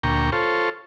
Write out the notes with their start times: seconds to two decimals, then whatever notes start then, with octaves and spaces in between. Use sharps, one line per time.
0.03 D2 A#2 G5 A#5 C#6
0.32 F4 A4 C5 C#5